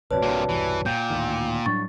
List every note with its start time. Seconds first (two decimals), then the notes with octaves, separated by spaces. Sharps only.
0.11 A#1 F2 C3 F#4 B4 C#5 D5 A5
0.22 A#1 G2 C3 A#3
0.49 E1 C2 G2 E3
0.86 A#2 G5 G6
1.10 D2 A2 D#3
1.66 A2 F#3 G3 D4 C#6 A6